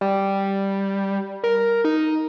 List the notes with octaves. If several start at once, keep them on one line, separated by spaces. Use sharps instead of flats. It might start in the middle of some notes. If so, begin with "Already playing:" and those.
G3
A#4
D#4